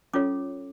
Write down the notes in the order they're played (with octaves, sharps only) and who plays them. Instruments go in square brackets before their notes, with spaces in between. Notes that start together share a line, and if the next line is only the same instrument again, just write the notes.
[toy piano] C#4 F4 A4 C#5 D6